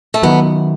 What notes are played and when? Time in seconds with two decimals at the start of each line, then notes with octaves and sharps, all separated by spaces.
0.14 A3
0.23 D#3 F#3 B3